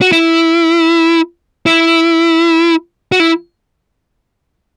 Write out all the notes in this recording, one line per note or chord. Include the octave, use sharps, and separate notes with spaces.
F#4
E4
E4
F#4
E4